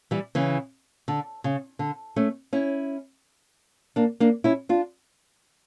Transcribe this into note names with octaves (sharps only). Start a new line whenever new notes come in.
E3 G3
C#3 E3
D3
C#3
D3
A3 C#4
C#4 E4
A#3 D4
A#3 D4
C#4 E4
D4 F4